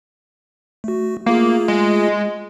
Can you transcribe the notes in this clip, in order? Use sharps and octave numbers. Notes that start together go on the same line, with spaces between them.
A3 F#4
A3 A#3 F4 G#4
G#3